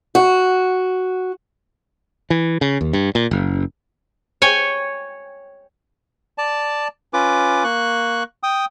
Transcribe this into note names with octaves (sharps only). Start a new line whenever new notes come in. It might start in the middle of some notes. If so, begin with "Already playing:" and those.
F#4
E3
C#3
D#2
G2
A#2
F#1
C#5 G5 G#5
D5 A5
C#4 F4 B4 D6
A#3 C#6 F#6
G5 D#6